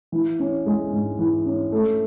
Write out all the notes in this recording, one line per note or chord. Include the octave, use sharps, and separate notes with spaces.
E3
C#4
G#3
G#2
E3
C#4
A3